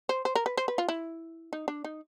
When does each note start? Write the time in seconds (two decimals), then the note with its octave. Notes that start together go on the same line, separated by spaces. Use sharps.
0.09 C5
0.25 C5
0.35 A#4
0.46 B4
0.57 C5
0.68 B4
0.78 F4
0.89 E4
1.53 D#4
1.68 D4
1.84 D#4